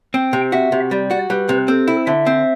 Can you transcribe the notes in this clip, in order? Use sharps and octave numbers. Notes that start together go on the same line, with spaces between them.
C4 G5
C3
F#4 E5
C3
G3 D5
F#4
G3 B4
C3
C4 A4
E4
D3 E5
C4